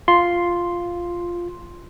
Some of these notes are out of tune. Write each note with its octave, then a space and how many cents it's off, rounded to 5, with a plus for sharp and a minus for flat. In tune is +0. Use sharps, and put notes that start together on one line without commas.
F4 +0 C6 +5